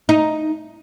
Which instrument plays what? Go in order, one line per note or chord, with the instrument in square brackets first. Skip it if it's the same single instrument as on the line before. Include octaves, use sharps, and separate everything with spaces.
[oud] D#4